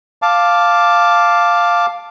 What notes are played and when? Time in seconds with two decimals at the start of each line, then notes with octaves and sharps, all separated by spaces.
0.22 F5 A5 D6